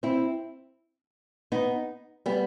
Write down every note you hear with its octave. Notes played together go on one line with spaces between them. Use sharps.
C4 E4
B3 D#4
G3 B3